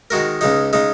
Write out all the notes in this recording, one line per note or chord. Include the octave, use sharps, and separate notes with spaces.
D#3 G#3 F#4 A#4
C#2 C#3 G#3 D#4
C#3 G#3 D#4